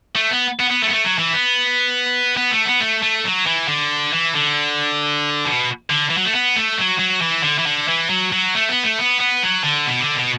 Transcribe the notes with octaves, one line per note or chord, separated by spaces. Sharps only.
A3
B3
B3
B3
A3
B3
A3
F#3
E3
B3
B3
A3
B3
A3
A3
F#3
E3
D3
E3
D3
B2
D3
E3
F#3
A3
B3
A3
F#3
F#3
E3
D3
E3
D3
E3
F#3
F#3
A3
B3
A3
B3
B3
F#3
D3
B2
D3
B2